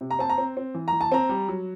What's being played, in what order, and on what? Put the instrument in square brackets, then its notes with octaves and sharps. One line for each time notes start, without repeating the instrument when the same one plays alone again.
[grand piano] C3
[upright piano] A#5
[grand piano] C4 [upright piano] A5
[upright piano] A#5
[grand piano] C4
C4
E3
[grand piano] E3 [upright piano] A#5
[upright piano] A5
[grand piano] C4 [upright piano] A#5
[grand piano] G3
F#3